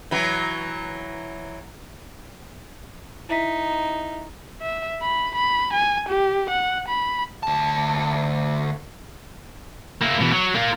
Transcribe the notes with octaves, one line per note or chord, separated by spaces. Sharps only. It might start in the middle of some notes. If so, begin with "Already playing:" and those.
E3 F#3
D#4 E4 E5 B6
E5
B5
B5
G#5
G4
F#5
B5
D2 A5
A#3 E4
B2 E3
F#3
A#3 F4